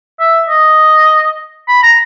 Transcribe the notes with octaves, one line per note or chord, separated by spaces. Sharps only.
E5
D#5
B5
A#5